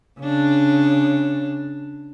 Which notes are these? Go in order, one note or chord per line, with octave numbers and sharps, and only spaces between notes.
C#3 D4